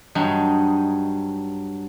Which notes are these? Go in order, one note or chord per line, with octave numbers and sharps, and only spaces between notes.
G2 F#3 D#4